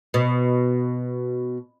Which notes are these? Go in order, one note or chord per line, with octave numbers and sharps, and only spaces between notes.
B2